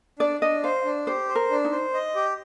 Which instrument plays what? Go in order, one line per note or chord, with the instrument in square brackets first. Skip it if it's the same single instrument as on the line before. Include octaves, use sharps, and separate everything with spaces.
[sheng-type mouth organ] D4 [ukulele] D5
[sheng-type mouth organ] D4 [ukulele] D#5
[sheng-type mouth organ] C5 [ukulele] F5
[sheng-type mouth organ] D4
[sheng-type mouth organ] G4 [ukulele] C5
[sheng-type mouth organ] C5
[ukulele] A#4
[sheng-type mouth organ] D4
[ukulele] D#4
[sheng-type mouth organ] C5
D#5
G4